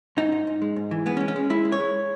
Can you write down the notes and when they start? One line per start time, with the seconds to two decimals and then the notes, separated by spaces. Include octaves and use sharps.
0.17 G#2 D#4
0.32 G#2
0.47 G#2
0.62 G#3
0.76 G#2
0.91 E3
1.06 G#3 B3
1.17 C#4
1.20 G#3
1.28 C#4
1.36 G#3
1.50 G#3 E4
1.65 G#3
1.72 C#5
1.80 G#3